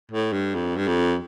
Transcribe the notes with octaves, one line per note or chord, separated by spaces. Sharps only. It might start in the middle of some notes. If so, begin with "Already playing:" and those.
A2
G2
F2
G2
F2